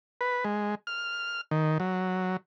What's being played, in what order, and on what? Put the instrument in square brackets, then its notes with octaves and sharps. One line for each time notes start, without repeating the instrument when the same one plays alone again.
[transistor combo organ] B4
G#3
F6
D#3
F#3